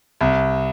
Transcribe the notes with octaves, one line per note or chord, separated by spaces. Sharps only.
C2